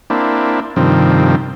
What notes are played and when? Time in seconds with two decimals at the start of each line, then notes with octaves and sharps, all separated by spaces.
0.10 A#3 C4 D4 E4
0.76 G2 C3 D#3 F3 C4